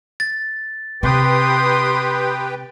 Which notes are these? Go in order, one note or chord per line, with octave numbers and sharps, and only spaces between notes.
A6
C3 G4 B4 G5 C6 D#6